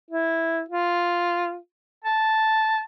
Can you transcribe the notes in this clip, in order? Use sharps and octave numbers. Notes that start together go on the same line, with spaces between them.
E4
F4
A5